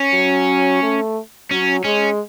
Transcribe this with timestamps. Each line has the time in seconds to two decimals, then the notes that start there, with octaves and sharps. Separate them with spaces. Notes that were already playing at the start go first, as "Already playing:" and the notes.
Already playing: C#4
0.14 F#3
0.82 A3
1.51 F#3 C#4
1.84 G#3 C#4